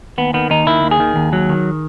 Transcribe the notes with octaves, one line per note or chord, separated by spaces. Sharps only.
D#2 B3
D#3 B3
D#2 D#4
D#3 E4
D#2
G#4
D#3
D#2
F#3
D#3